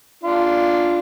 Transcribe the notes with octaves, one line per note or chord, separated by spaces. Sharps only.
D4 F4